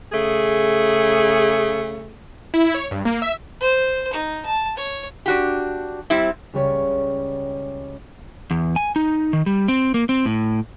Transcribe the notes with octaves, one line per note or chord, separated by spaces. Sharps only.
C#3 A3 G#4
E4
C#5
G2
A#3
E5
C5
D#4
A5
C#5
D4 F#4 G4
G3 C4 E4
C#2 G3 C#5
E2
G#5
D#4
D#3
G3
C4
A#3
C4
A2